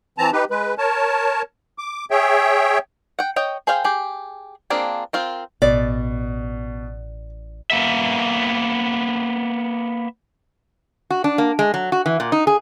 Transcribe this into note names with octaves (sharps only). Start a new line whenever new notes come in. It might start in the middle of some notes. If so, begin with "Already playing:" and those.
E3 C4 A5 A#5
D#4 G4 B4
G#3 B4
A#4 C#5 A5
D6
G#4 C#5 E5 G5
F#5 G5
C#5 D#5 G5
G#4 C5 F5 G5
G4 G#4
A#3 C4 D4 F4 G#4
C4 F4 A#4
A1 B2 D5
A#3 B3 E5
F#4
D4
A#3
G#3
F#3
F#4
E3
A#2
D#4
G#4